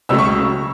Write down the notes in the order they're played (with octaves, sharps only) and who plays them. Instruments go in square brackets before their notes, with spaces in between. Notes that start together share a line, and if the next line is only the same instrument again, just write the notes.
[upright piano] C#2 C#3 F#3 A3 E6
C#6